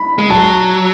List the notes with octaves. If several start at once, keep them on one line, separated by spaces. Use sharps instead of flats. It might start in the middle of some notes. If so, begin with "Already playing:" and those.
Already playing: B5
G#3
F#3 A5